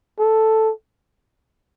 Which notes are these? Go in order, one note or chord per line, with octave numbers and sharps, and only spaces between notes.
A4